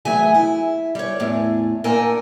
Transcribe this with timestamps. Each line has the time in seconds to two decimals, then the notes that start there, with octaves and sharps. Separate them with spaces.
0.05 E3 F#3 A3 G#4 E5 G#5
0.34 E4
0.95 G3 C#5
1.20 E2 A2 G#4
1.84 A#2 D4 A4 A#4 G5 G#5